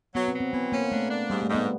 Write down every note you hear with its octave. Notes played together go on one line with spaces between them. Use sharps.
F#3 B3
C4
F#3
C4
E3 B3
A#3 C#4
A3 D4
D4
G#2 G3
A3
G#2
B3